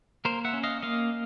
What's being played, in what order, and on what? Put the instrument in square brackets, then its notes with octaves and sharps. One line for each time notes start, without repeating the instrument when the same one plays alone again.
[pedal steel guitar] A#3 A#4 C5
E5 F#5
C#4
D#5 F5
A#3 D#5 F5